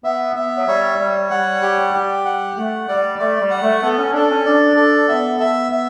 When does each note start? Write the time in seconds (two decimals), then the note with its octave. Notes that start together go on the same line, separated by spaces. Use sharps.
0.04 B3 E5
0.36 B3 E5
0.57 F#3
0.68 G3 C#5
0.99 G3 C#5
1.30 G3 F#5
1.62 G4
1.94 G4
2.25 F#5
2.56 A3 F#5
2.88 G3 D5
3.19 A3 D5
3.41 G3
3.51 F#5
3.62 A3
3.82 B3 A4
3.98 C#4
4.13 D4 A4
4.30 C#4
4.45 D4 D5
4.76 A4
5.08 B3 E5
5.40 E5
5.72 E5